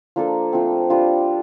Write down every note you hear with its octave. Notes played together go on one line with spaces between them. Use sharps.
F3 A#3 D4 A4
F3 A3 C4
G3 D4 F4